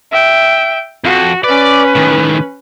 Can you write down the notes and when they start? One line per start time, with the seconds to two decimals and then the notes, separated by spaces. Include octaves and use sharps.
0.11 E5 G5
1.04 F2 F#4
1.44 C#4 B4 D5
1.95 A2 D#3